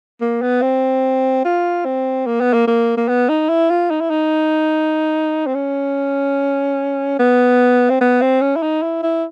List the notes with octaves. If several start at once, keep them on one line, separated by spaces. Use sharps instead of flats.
A#3
B3
C4
F4
C4
A#3
B3
A#3
A#3
A#3
B3
D#4
E4
F4
D#4
E4
D#4
C4
C#4
B3
C4
B3
C4
C#4
E4
D#4
E4
E4